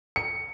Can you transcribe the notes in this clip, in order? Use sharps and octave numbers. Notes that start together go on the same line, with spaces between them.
C#7